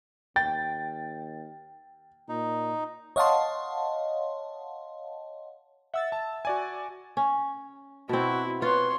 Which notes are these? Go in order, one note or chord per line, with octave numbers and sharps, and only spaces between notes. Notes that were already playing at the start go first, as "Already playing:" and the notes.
D#2 G5 A6
A#2 D#4
C#5 D#5 F5 F#5 A5 C6
E5 F#5 E6 A6
A5
F#4 D5 G#5
C#4
B2 C4 E4 F#4
F4 B4 C#5 C6